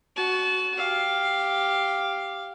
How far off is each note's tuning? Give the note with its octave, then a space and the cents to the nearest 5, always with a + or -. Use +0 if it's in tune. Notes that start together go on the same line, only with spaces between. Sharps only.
F#4 +5 A5 -30
G4 +0 F5 +0